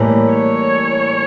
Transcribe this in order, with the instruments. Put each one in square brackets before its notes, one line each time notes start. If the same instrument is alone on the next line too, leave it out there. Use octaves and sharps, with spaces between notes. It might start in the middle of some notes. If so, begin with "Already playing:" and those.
Already playing: [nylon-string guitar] A2 E3 G3 A#3
[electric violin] C#5